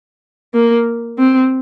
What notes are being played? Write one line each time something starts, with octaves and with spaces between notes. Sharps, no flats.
A#3
C4